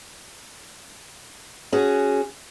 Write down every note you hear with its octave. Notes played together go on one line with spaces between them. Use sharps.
C#4 F#4 G#4